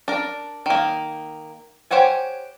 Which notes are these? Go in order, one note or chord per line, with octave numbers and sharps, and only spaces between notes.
D4 A#4
D#3 A#3
G4 C5 C#5 F#5 G#5